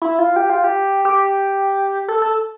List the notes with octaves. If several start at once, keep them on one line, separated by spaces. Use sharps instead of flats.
E4
F4
G4
F4
G4
G4
A4
A4